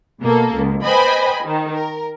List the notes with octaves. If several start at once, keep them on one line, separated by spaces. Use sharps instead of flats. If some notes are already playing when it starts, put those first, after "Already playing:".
B2 A#3 A4
C#2
B4 C5 D#5 G5 G#5 B5
D#3
A#4